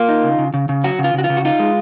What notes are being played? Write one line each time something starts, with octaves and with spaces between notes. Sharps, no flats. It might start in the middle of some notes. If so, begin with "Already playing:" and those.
Already playing: A#3 F4
D#4
C#3
C#3
C#3
C#3
F#3 F#4
C#3
F4
C#3 F#4
F4
C#3
F#4
D#4 F4
G#3